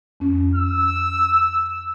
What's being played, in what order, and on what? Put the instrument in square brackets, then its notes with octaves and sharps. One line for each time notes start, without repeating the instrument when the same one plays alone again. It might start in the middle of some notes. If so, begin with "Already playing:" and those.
[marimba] F2 C#4
[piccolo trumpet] E6